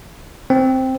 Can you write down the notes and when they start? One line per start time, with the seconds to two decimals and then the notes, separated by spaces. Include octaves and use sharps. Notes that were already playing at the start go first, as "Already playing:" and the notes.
0.50 C4